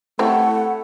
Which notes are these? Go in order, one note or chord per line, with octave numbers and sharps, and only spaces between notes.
A3 C4 E4 G4 A4 C#5 F#5